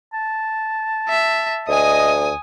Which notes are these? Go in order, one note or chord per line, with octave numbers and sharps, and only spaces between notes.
A5
E5
D2 D#5 G#5 D#6